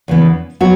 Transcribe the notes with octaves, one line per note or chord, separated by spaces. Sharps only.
E2 C#3 E3 B3
F#3 B3 F#4